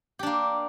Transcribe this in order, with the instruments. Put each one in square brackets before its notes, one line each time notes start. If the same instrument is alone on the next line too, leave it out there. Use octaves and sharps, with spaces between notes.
[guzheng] G4
D4
A#3